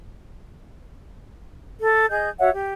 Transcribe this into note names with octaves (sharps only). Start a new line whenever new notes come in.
A4
G#4 D#5 G6
F#4 C#5 E5 F#5
G4